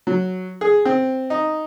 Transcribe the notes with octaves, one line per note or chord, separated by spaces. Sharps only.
F#3
G#4
C4
D#4